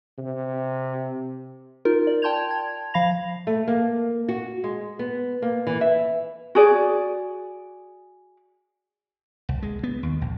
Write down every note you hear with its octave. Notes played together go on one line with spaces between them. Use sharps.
C3
D#4 F4 A#4
D5
G5 A5 C6 G6 G#6 F7
G#6
F3 F5 B5 A#6 F7
A3
A#3
F#4
G#3
B3
A#3
E3
E5
F#4 G#4 D5
C2
G#3
B3
D#2
A#1